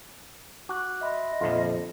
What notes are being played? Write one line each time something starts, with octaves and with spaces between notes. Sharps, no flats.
F#4 D6 F#6
D#5 E5 B5 C6
A#1 F2 D3 F4